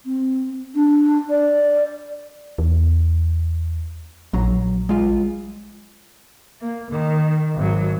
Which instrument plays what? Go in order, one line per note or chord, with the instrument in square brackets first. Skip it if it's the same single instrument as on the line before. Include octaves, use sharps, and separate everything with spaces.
[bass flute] C4
D4
D5
[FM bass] E2
[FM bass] A#1 [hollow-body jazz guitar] F#3 A#5
[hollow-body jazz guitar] G#3 F4
[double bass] A#3
D#3
G#1 F#3